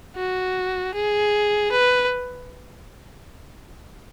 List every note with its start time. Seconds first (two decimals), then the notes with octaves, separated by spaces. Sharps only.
0.16 F#4
0.94 G#4
1.72 B4